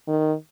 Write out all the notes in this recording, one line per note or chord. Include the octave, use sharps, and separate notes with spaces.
D#3